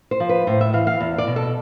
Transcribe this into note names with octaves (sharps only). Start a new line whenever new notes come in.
C5
F3
B4
A2 C5
E5
E3 F5
F5
E2
D5
B2
A4